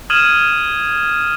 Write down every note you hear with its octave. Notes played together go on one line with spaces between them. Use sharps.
D#6 F6 G#6 D#7 E7 F#7